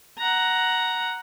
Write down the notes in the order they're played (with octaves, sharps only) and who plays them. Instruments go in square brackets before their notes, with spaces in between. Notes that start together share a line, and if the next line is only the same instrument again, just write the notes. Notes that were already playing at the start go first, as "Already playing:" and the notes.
[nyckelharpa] F#5 A#5